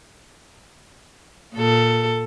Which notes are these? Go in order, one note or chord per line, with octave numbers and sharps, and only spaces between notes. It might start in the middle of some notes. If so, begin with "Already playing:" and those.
A#2 A4